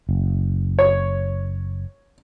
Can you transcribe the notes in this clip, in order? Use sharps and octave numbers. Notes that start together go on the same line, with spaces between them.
F#1
C#5